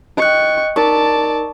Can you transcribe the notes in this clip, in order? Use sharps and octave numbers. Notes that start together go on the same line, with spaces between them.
D#5 G5 C#6 F#6
D#4 A#4 D5 A5 C#6